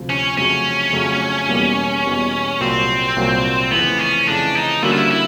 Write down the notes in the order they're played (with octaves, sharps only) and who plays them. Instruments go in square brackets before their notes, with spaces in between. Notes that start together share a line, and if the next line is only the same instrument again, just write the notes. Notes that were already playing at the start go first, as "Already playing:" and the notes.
Already playing: [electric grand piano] D2 C3 F3
[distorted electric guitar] C#4
[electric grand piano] F2 C#3 F#3 A3 [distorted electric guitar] C#4
[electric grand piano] F2 C#3 F#3 A3
E2 B2 G3 A#3
E2 B2 G3 A#3
[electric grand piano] C2 A#2 F#3 [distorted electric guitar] C4
[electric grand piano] C2 A#2 F#3
[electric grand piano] F2 C#3 E3 A3 [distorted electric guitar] B3
[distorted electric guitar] C#4
[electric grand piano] F2 C#3 E3 A3 [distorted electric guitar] D4
[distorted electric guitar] D#4
[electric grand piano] D3 G3 A#3 C#4 F#4 [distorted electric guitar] E4
[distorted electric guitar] F4
E4
E4